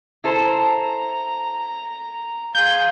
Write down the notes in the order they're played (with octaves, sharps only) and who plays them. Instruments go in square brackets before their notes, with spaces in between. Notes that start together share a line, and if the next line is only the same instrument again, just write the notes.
[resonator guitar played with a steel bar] E4 A4 C5 [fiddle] A#5
[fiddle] G#4 [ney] F5 [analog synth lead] G6